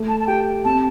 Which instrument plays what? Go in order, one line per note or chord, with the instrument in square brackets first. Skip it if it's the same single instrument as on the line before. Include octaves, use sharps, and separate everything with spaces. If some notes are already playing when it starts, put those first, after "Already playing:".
Already playing: [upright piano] A3
[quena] A5
A5
[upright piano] G4 [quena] G5
[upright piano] C4 [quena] A5